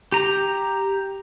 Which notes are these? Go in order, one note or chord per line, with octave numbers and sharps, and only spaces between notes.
G4 A#5